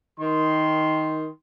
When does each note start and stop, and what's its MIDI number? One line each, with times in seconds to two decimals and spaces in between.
0.20 1.27 51
0.20 1.27 84